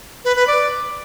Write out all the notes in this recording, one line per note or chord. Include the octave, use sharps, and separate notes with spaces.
B4
B4
D5